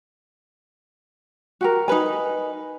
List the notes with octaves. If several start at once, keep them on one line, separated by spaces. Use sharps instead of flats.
F#4 G4 A#4
D#4 A#4 B4 G#5